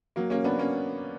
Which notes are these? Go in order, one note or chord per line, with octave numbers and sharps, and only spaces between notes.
F#3 A#3
A#3 C#4
B3 D4
A#3 C#4